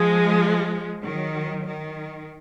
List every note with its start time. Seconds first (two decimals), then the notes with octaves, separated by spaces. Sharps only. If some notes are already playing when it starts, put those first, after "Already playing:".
Already playing: F3 G#3
1.01 D#3 F#3
1.66 D#3